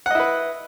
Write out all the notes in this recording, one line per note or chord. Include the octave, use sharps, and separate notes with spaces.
E4 B4 D#5 F#5